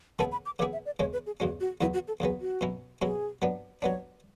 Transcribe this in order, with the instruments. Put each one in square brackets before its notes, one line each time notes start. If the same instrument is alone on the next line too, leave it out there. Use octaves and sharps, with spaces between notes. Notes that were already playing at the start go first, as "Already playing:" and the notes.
[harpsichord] C#3 E3 B3 E4 G#4 [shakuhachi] A5
[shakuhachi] B5
D6
[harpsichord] C#3 E3 B3 E4 G#4 [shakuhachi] D6
[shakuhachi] E5
D5
[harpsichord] E2 C#3 G#3 C#4 [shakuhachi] C#5
[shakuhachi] B4
G#4
[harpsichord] E2 C#3 G#3 C#4 [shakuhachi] F#4
[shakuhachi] F#4
[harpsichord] E2 C#3 F#3 B3 [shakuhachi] E4
[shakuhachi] F#4
A4
[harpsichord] E2 C#3 F#3 B3 [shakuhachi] G#4
[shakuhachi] F#4
[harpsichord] B2 F#3 C#4 E4
[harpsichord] B2 F#3 C#4 E4 [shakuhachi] G#4
[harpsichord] F#3 B3 D4
[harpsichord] F#3 B3 D4 [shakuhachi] C#5